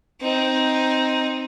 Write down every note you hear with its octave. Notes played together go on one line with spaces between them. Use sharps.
C4 D#4